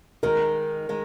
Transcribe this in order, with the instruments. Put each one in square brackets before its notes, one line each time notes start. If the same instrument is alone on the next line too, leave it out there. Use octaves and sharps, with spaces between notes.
[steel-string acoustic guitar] D#3 G#3 D#4 [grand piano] A#4
[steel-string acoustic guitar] D#3 G#3